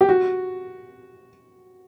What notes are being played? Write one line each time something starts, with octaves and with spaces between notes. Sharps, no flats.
G4
F#4